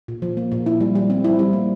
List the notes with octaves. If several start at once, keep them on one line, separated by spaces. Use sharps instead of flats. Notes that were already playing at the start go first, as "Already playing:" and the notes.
A#2
F3
A#3
A#2
E4
G3
G3
C4
E4
G3
A#3